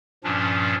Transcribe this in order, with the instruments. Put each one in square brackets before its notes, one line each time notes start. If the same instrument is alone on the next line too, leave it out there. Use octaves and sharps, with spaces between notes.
[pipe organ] G2 A#2 F3 C#4 D4